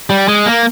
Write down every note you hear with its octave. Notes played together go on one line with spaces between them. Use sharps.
G3
G#3
A#3